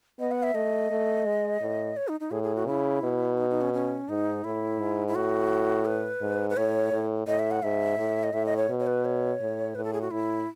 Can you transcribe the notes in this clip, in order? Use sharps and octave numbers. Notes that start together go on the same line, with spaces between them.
B3 D#5
F#5
E5
A3 D#5
A3
G#3
A2
C#5
D#4
D#4
A2 G#4
G#4
F#4
C#3 E4
B2
D#4
D#4
C#4
C#4
G#2 D#4
A2 E4
G#2
E4
A2 F#4
B4
G#2
B4
A2 C#5
A2
A2 D#5
E5
F#5
G#2 E5
A2
D#5
A2 E5
D#5
C#5
B2
C#5
B4
C#5
A2
A2 B4
A4
G#4
F#4
A2 E4